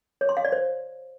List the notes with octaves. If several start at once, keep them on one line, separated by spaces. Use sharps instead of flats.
C#5
C6
F5
D5
C5